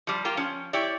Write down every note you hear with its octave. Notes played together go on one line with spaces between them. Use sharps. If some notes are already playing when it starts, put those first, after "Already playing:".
F3 G3
A#3 F4 G4
F3 C#4
E4 G4 C#5 D5